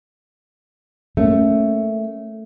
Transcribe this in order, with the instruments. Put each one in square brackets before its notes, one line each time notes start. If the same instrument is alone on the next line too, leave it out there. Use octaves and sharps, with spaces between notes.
[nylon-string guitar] A3 [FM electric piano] A#3 C#4